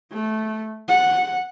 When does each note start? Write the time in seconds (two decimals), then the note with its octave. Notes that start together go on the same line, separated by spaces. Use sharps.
0.12 A3
0.88 F#5